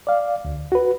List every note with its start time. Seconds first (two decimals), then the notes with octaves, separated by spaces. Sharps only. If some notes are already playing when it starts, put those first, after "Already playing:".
0.07 D5 F5
0.45 D2
0.72 F#4 B4